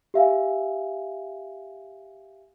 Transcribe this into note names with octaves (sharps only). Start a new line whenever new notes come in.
G4 E5 F5 G#5